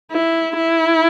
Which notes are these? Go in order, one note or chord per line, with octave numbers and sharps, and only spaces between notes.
E4
E4